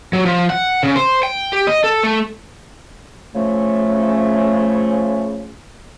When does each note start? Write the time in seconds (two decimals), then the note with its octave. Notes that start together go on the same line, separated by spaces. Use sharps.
0.13 F#3
0.26 F3
0.50 F#5
0.83 C#3
0.96 C5
1.23 G5
1.53 G4
1.67 D#5
1.84 A4
2.03 A3
3.35 C#3 F3 A3